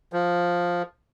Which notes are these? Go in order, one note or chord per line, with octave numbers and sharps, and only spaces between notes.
F3